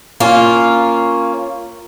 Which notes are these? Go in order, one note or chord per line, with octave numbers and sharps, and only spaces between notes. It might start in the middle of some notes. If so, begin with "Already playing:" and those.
A#3 C#4 F4